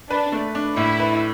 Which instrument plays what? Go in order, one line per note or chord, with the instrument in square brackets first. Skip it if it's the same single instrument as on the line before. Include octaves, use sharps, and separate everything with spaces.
[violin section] D4 [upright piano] B4
[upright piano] A3
D4
[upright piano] A2 [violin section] E4
[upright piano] B4